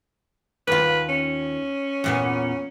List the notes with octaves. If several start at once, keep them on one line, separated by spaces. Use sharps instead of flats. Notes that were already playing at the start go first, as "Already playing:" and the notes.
D#2 F4 B4
C#4
E2 A#2 B3